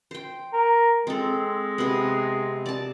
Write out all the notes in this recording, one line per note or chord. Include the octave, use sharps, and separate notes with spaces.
C5 G5
A#4
G#3 C4 A4
C3 B3
D5 A5